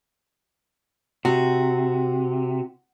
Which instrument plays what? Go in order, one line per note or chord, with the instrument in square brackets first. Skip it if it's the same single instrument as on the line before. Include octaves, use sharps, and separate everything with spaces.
[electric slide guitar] C3 [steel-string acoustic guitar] F#4